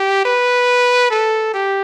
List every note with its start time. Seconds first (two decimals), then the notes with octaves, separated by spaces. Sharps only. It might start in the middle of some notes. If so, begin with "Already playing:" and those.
Already playing: G4
0.25 B4
1.10 A4
1.54 G4